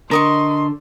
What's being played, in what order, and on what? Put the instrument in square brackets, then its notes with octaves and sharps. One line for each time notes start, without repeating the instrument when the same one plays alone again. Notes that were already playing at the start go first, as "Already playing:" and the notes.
[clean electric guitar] D3 [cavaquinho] A#4 D#5 C#6 [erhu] C6